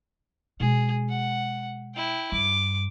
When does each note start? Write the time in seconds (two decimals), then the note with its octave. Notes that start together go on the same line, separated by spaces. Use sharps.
0.60 B2 G#3 G#4
1.09 F#5
1.95 E4 G5
2.32 G2 D6